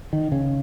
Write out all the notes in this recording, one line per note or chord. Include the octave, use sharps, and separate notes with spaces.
D#3
C#3